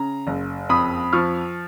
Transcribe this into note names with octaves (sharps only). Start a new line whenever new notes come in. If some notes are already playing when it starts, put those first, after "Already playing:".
Already playing: C#3 A#5
F#1
F2 B5 D#6
F3 C#6 F6